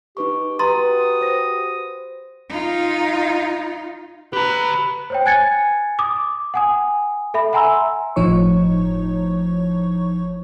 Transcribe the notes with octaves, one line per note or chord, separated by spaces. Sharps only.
D#4 G4 B4 C#6
F#4 G4 B4 A#5 C6 D#6 A6
C5 A#6
D#4 F4
G4 B4 A#5
C5 C#5 G5
G#5 F#6 G#6 A6 C#7
D6 D#6
F#5 G#5 D#6
A4 E5 B5
E5 F#5 G#5 A#5 C6 E6
G1 A2 F3 D#4 C#5 C#6